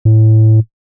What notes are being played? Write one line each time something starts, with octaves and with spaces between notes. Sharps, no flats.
A2